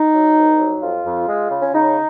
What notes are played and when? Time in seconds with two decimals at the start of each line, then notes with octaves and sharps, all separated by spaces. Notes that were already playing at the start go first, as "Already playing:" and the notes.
Already playing: D#4
0.14 F#3
0.36 C2
0.59 F#3
0.81 F2 F4
1.05 F2
1.28 G#3
1.50 C#3
1.62 C#4
1.73 C#3 D#4